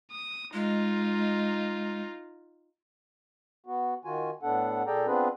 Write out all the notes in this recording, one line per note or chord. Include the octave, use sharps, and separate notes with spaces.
D#6
G#3 D#4 F4
B3 F#4
D#3 F4 F#4 G#5
A2 B3 D4 A4 F#5
A#2 G#4 A4 D5 G5 A#5
B3 C4 D4 F4 G#4 B4